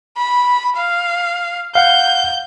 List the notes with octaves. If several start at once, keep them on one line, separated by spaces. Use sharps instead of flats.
B5
F5
F5 F#5 G6